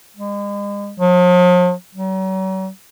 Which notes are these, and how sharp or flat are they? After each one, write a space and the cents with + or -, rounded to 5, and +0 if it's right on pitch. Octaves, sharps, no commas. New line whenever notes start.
G#3 -40
F3 +45
F#3 +40